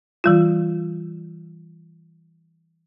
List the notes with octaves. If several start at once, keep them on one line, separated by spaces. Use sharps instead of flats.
E3 G3 F4